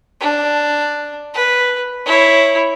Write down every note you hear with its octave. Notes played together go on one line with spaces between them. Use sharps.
D4
B4
E4 C#5